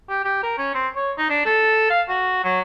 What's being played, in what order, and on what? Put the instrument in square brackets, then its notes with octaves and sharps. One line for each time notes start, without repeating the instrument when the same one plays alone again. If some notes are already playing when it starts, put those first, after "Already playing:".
[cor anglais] G4
G4
A#4
C#4
C4
C#5
D#4
D4
A4
F5
F#4
F#3